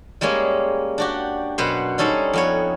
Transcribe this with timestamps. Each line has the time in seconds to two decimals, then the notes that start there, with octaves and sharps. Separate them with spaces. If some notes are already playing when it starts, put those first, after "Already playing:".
0.21 G3 G#3 A#3 C#4 G#4
0.98 D4 F#4 G4
1.58 F#2 B2 B3 B4 C5
1.98 G3 C#4 D#4 A4 C5
2.33 F2 B3 C#5